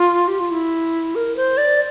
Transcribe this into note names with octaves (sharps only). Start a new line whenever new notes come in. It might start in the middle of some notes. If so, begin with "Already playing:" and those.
Already playing: F4
G4
F4
E4
A#4
C5
D5